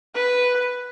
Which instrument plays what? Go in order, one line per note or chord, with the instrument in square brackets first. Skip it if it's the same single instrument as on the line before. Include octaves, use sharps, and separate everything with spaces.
[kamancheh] B4